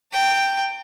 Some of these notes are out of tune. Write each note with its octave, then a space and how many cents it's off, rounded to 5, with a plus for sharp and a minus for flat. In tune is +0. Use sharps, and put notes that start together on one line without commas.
G5 +0 A#5 -45